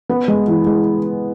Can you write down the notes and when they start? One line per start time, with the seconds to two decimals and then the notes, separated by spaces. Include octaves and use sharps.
0.09 B3
0.28 G#3
0.48 E3
0.66 G#3